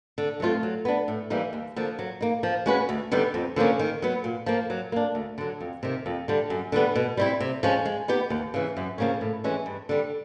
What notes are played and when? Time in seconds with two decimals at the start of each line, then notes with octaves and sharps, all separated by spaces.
0.18 D3
0.40 F#3 A3 C4 F4
0.63 F#3
0.85 B3 D4
1.08 A2
1.30 E3 G3 A#3 D#4
1.53 D#2
1.76 D3 F3 A#3
1.99 F#3
2.21 A#3 D#4
2.43 F3
2.66 G#3 C#4 F#4 B4
2.89 D2
3.11 D3 G3 B3 D#4
3.34 F2
3.56 D3 F3 A#3 C#4
3.79 D#3
4.02 F#3 B3
4.24 A#2
4.46 F3 A#3
4.70 F#3
4.92 A#3 D4
5.15 D2
5.38 D3 F#3
5.61 F2
5.83 C3 D#3
6.06 F2
6.28 D3 G3
6.50 F#2
6.72 D3 G3 B3
6.96 B2
7.17 G3 C4 E4
7.40 C3
7.63 F3 G#3 C#4
7.85 G#3
8.08 B3 D#4 G4
8.30 D#2
8.54 C#3 E3
8.77 F#2
8.98 C#3 F3 A#3 C#4
9.21 A2
9.44 E3 G#3 C#4
9.66 G2
9.89 D3 G3